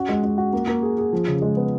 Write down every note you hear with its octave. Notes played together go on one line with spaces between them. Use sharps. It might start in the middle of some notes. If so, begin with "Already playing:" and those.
Already playing: C#4 F#4
G#3
G#3
F#4
A#3
A#3
G#4
G#4
F3
C#3
G#3
B3